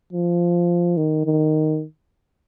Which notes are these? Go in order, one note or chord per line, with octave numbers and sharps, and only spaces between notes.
F3
D#3
D#3